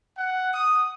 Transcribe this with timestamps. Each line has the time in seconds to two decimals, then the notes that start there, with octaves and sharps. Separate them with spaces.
0.18 F#5
0.54 D#6